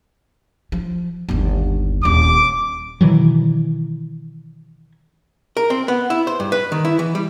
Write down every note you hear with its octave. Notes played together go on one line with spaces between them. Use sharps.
F3
G1 D#2
D#1 G3 D6
B2 D#3 E3 F#3
A#4
C4
B3
E4
C5
G2
B4
D#3
E4
E3
G3